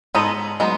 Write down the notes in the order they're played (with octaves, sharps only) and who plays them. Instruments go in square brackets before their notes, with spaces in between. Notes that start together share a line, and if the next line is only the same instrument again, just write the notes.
[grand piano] G#2 [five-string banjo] G#3 B3 D#4 A4 D#5
[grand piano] F#3 [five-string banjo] G#3 B3 D#4